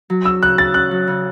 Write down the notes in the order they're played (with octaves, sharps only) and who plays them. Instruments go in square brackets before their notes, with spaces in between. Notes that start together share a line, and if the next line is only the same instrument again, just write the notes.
[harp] F#3
[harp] C#4 [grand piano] E6
[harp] C#3 [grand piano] F#6
[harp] C#3 [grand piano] A6
[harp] C#4 [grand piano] F#6
[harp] F#3
C#3